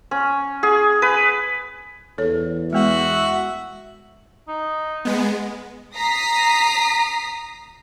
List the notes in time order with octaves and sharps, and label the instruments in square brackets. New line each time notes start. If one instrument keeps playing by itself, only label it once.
[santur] C#4
G#4
B4
[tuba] E2 [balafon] A4 C#5
[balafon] G#3 B3 [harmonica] F#4 E5
[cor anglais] D#4
[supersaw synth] G#3 B3
[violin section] A#5 D#6 B6 C7